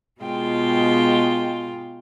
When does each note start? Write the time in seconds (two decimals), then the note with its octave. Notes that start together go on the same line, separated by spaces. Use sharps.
0.22 B2 G#3 F4 G5